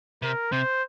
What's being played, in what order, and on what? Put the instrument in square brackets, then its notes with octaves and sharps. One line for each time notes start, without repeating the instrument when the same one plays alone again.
[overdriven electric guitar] C3 [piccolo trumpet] A#4
[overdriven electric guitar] C3 [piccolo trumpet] C5